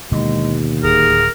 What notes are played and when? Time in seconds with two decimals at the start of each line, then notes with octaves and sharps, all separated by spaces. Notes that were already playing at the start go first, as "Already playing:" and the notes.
0.12 D#2 B2 D3 E3 G#3
0.84 D1 G#4 A#4